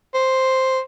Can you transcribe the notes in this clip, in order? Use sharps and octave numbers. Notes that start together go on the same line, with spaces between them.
C5